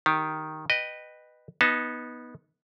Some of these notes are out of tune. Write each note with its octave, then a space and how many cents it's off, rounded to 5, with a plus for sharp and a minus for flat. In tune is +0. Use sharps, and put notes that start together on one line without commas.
D#3 +0 G4 +0
B4 +0 D#5 -15 G5 +0
B3 -10 D#4 +10 A5 +0